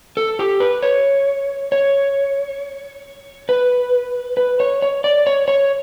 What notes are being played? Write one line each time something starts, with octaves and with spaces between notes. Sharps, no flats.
A4
G4
B4
C#5
C#5
B4
B4
C#5
C#5
D5
C#5
C#5